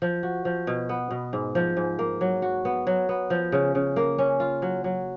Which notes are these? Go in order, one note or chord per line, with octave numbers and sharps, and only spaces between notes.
F3
F#4
F3
B2
B3
B2
G#2
F3
G#2
A#3
F#3
F#4
B3
F#3
B3
F3
C#3
C#3
A#3
C#4
F4
F#3
F#3